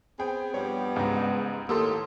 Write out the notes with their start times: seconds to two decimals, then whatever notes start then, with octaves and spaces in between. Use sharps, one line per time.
0.20 B3 C4 G#4 G5
0.54 G2 F3 G3 B3 C#5
0.96 C#2 G#2 A#5
1.69 D#2 A2 A#3 G4 A4 C6 D#6 E6